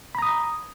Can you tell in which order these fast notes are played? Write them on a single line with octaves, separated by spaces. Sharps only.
B5 A#5 D#6